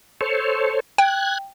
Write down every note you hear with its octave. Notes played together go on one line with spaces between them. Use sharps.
A4 C5 C#5
G5 F#6 G#6